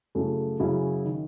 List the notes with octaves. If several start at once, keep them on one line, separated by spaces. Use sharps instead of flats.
F#2 C#3 F#3 A3 E4
F#2 C#3 F#3 C#4 E4
D#3